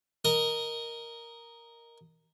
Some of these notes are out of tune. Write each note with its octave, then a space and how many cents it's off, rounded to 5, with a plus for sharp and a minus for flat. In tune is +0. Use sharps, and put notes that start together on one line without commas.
A#4 +0 D#5 +0